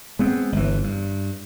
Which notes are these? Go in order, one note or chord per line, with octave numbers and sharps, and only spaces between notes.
G#3 B3 C4
G1 E3
G2